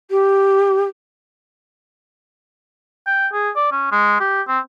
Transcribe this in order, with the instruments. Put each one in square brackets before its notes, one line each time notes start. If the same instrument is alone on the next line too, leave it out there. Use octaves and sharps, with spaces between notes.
[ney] G4
[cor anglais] G5
G#4
D5
C#4
G#3
G4
C4